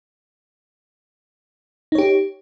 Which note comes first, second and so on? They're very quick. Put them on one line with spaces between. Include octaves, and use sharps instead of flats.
D#4 C#5 G4